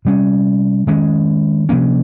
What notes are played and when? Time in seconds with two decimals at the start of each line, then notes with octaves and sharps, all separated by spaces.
0.05 C3 G3 C#4
0.87 D#3 G#3 C#4
1.69 C3 F3 A#3 C#4